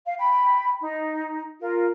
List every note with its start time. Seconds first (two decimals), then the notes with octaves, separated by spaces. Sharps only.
0.06 F5
0.19 G5 B5
0.80 D#4
1.61 F4 A#4